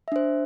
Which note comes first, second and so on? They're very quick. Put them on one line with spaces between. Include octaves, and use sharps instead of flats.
E5 D4 C5